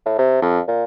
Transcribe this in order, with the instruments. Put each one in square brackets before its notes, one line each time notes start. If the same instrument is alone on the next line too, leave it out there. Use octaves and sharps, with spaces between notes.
[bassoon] A2
C3
F2
A#2